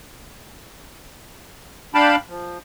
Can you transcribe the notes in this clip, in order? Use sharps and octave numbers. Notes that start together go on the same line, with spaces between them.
D4 F5 G5 A5 B5
F3